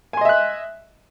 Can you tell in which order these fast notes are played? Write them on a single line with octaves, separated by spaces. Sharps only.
G#5 C6 D#5 E5 F#6